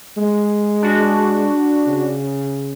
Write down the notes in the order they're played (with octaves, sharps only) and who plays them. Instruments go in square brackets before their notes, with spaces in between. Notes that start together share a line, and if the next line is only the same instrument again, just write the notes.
[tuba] G#3
[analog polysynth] D4 F#4
[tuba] C#3